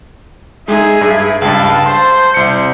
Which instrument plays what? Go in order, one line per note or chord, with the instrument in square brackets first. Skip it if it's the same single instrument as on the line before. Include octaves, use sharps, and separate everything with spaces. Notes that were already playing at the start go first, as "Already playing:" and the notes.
[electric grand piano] G#3 D#4 [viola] G#4 E5
[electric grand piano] G2
[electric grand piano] C#2 G2 [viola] A5
[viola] C5 [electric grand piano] C6
[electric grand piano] C2 C#7